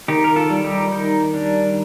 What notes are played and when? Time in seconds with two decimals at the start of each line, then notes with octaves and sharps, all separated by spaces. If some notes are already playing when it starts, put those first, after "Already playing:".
0.08 D#3 D#4 G4
0.24 A#4
0.36 F4 A4
0.50 G3
0.64 D#4 G4
0.91 D#3 D#4
1.34 G3 D4